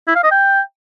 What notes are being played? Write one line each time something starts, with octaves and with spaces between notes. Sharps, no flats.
E4
F5
D#5
G5